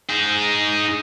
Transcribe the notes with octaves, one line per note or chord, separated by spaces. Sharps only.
D#4 G#4